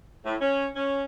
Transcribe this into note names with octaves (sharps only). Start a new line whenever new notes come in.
A2
C#4
C#4